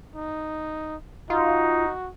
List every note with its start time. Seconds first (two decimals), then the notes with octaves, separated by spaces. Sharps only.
0.15 D#4
1.30 D#4 F4 F#4